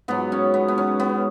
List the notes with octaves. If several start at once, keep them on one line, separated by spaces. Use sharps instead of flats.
G#2 F#3 B3
C#4
B3
B3
C#4
B3